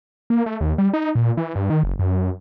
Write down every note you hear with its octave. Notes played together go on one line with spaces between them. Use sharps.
A#3
A3
D#2
G3
D#4
A#2
E3
G2
D#3
F#1
F#2